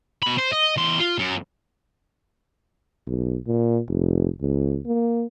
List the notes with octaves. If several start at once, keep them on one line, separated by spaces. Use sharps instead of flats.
B2 B5
C5
D#5
E2 C6
F4
F#2
B1
A#2
F1
C#2
A#3